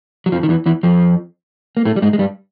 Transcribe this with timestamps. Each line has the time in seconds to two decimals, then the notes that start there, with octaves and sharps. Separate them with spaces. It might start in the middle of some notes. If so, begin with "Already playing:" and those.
0.26 F#3
0.32 F2 F3
0.43 D#3
0.49 E2 E3
0.66 E2 E3
0.83 F2 F3
1.77 A#3
1.85 A2 A3
1.96 G3
2.02 G#2 G#3
2.13 G#3
2.19 G2 G3